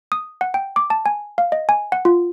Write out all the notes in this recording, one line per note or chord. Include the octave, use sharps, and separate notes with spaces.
D#6
F#5
G5
D6
A5
G#5
F5
D#5
G#5
F#5
F4